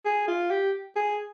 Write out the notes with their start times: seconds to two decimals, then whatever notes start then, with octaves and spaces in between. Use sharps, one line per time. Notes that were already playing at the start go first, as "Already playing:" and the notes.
0.05 G#4
0.28 F4
0.51 G4
0.96 G#4